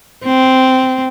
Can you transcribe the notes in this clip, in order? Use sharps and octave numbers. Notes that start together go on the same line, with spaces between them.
C4